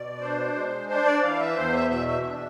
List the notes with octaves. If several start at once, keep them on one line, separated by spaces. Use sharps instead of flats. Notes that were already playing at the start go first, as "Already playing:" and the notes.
Already playing: B2 D5
D4 C5
G#3
D4 C5
D5
E3 F5
E5
E2 C5
E5
B2 E5
E5
D4